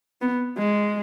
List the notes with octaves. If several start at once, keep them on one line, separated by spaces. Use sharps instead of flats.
B3
G#3